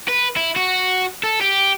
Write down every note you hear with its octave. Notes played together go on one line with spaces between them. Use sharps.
B4
E4
F#4
A4
G4